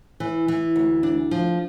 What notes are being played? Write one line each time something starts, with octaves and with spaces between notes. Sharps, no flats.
E3
E3
D2
D4
F3